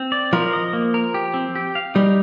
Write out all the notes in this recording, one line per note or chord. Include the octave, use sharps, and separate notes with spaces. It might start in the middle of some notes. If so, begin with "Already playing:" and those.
Already playing: C4
D5
F3 A#4
D#5
A#3
A#4
G4
C4
G4
F5
G3 D#4